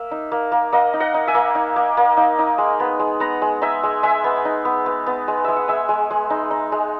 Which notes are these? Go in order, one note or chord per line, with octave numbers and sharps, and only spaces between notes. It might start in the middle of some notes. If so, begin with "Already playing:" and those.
Already playing: A#3 E5
D#4
A#3
A#3
A#3 D#5 F#5
D#4
D#5 F#5
D#4
E5 G#5
A#3
D#4
A#3
A#3
D#4
D#4
G#3
B3
G#3
B3 F#5 A#5
G#3
D#4 E5 G#5
G#3
G#3 E5 G#5
B3
D#4
B3
B3
B3
G#3
G#3 E5
F#5
G#3 E5 G#5
G#3
G#3
D#4
D#4
G#3